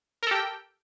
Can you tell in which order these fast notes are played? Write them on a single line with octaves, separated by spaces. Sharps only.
A#4 A4 G4 G5